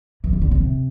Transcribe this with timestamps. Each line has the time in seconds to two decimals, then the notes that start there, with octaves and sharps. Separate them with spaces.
0.24 E3
0.33 D#3
0.42 D3
0.51 C#3
0.60 C3